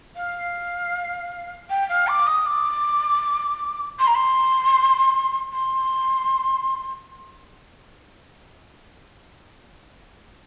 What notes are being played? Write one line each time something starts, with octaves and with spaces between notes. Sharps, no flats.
F5
G5
F5
D6
D#6
D6
C6
A#5
C6
C6